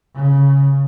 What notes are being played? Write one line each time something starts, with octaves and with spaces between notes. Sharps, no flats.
C#3